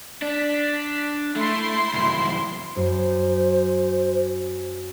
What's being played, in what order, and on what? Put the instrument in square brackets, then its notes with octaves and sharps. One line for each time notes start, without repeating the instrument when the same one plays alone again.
[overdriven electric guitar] D4 [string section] B6
[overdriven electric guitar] A3 [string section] E4 C6
[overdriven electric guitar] C2 F#2
[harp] F#2 [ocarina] C5